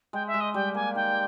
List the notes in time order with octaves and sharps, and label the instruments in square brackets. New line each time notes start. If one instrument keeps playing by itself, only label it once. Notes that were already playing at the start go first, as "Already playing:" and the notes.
[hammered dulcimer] G#3 [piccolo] G5
[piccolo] E5
[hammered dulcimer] G#3
[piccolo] D#5
[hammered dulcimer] G3 [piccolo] G5
[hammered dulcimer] A#3 [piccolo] G#5
[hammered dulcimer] D#3 [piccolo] G5